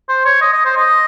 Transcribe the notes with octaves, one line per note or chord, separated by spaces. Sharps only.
C5
C#5
D#5
D#5
C5
D#5